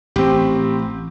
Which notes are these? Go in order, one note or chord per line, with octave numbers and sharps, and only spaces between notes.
A1 C4 G4